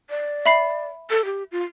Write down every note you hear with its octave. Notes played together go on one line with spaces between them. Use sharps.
D5
E5 B5 C7
A4
G4
F4